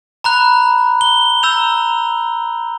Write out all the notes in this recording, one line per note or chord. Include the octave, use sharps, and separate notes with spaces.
A#5 B5 F#6
G7
A#5 E6 G6 F7